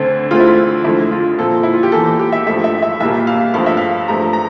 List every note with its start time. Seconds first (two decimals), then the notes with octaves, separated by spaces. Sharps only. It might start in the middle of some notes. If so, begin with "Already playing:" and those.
Already playing: D2 D3 A3 C4
0.31 D2 D3 A3 C4 F4
0.40 E4
0.48 F4
0.84 F2 D3 A3 E4
1.11 F4
1.38 A#2 F3 C4 A4
1.63 E4
1.73 F4
1.83 G4
1.92 E2 E3 A#3 A4
2.19 G4
2.32 E5
2.47 G2 F3 A3 E5
2.64 E5
2.82 E5
3.00 C2 A#2 G3 A#3 E5
3.27 F5
3.54 G2 F3 A3 C4 F5
3.66 E5
3.77 F5
4.08 G2 F3 A3 C4 A#5
4.33 A#5